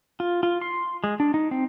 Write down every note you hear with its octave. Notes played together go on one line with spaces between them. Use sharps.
F4
F4
C6
G#3
D4
D#4
C4